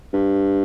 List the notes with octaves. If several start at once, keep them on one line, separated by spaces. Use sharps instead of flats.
G2